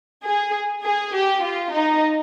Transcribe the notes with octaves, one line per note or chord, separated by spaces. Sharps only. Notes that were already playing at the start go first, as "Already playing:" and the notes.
G#4
G#4
G4
F4
D#4